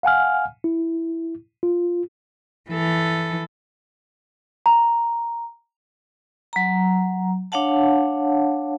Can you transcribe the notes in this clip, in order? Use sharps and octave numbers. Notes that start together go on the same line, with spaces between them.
F5 F#5 G#5 F6
E4
F4
E3 A4
A#5
F#3 A#5
D4 C#5 F5 F#5 A5